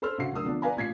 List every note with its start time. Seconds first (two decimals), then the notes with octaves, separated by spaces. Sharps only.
0.02 A4 C5 B5 C6 E6 F6
0.18 A#1 C#3 F#4 C7
0.33 D2 F#3 A#4 D#6 E6
0.44 D3 F3 B3 D4
0.62 B4 D5 F5 G#5 A#5 B5
0.76 A1 A#2 G#6 B6 C7